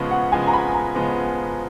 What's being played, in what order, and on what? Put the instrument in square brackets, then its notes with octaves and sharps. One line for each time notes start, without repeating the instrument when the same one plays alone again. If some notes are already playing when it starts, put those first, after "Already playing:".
Already playing: [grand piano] C#3 F3 G#3 B3 [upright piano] B5 C#6
[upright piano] F#5
[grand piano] C#3 F3 G#3 B3 [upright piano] G#5
[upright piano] A#5
B5
A#5
[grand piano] C#3 F3 G#3 B3